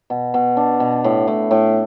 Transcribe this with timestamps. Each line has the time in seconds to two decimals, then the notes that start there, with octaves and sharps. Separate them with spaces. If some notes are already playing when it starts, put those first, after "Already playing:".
0.10 B2
0.34 B2
0.57 D4
0.80 B2
1.04 A2
1.28 A2
1.51 A2